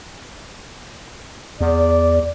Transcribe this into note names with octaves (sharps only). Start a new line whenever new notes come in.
E2 D5